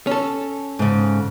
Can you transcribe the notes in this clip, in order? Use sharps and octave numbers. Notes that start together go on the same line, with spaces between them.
C#4 A4
G#2 C#3